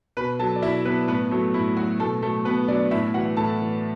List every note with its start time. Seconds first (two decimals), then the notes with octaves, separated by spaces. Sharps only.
0.17 B2 B4 B5
0.39 F#3 A4 A5
0.56 D5
0.62 B2 E4 E5
0.85 F#3 B3 B4
1.08 A2 B3 B4
1.31 F#3 A3 A4
1.54 A2 E4
1.77 F#3 F#4
2.00 B2 A3 A4
2.22 F#3 A3 A4
2.45 B2 B3 B4
2.68 F#3 D4 D5
2.91 A2 E4 E5
3.14 E3 F#4 F#5
3.37 A2 A4 A5
3.60 E3